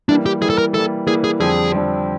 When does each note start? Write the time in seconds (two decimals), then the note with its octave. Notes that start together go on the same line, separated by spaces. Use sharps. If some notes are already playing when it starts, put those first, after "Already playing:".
0.09 E3 G3 A#3 D4
0.26 G4
0.42 E3 G3 A#3 G#4
0.50 A4
0.58 A#4
0.74 E3 G3 A#3 A4
1.07 E3 G3 A#3 G#4
1.24 G#4
1.40 F2 D3 G3 C4 G#4
1.72 F2 D3 G3 C4